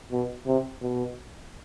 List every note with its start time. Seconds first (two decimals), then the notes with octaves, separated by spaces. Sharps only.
0.12 B2
0.47 C3
0.82 B2